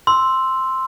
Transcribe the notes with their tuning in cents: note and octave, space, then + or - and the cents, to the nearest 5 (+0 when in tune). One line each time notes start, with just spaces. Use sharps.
C6 +0 E6 +0